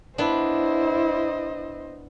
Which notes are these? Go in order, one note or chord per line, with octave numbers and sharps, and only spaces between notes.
B3 D4 E4 C5 D#5